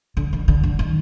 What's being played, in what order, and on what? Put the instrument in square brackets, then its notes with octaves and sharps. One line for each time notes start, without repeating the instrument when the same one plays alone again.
[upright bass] D3
D#3
D3
D3
D#3